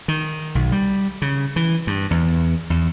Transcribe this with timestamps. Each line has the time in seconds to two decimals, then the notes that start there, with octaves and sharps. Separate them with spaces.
0.08 D#3
0.55 B1
0.72 G3
1.22 C#3
1.56 E3
1.87 G2
2.11 E2
2.70 E2